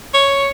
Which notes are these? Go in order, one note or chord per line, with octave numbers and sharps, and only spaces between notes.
C#5